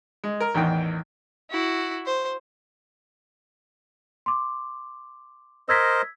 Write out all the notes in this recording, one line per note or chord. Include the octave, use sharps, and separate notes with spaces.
G#3
A#4
A1 E2 D#3 G5
E4 F#4
C5
C6 D6
A#4 C5 D#5 E6 G#6 B6